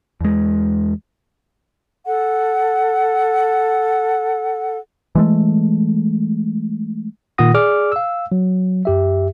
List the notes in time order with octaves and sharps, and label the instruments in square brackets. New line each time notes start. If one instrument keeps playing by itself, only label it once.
[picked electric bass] E2 G#3
[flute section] A4 F#5
[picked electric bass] E3 G#3 A3
[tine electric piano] A#2 D#3 F4 F#5 D#6 A#6
G#4 D5 D6 F6
F5 E6
F#3
F#2 G4 E5